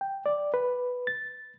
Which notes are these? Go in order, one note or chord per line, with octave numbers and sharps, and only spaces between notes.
G5
D5
B4
A6